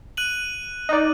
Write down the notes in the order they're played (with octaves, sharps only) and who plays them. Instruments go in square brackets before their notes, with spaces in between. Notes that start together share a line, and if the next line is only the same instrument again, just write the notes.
[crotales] F#6 D#7 F#7
[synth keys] D#4 D5